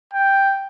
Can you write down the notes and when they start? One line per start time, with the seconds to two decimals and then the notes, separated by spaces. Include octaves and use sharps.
0.14 G5